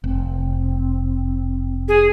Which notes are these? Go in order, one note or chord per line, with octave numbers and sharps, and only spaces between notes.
F1 C4
G#4